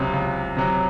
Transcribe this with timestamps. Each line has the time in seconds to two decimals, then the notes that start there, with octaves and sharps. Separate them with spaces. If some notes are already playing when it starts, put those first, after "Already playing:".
Already playing: C#2 C3 F#3
0.13 C#2
0.57 C3 F#3